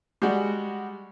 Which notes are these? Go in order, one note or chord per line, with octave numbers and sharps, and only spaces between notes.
G3 G#3 F#4